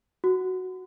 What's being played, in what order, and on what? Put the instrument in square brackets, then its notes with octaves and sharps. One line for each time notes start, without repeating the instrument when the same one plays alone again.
[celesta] F#4